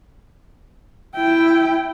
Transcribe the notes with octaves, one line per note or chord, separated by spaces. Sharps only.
E4 G5